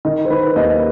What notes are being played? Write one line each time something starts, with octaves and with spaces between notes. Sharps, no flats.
D#3 D#5
C5
D#3 B4
D#2 D#5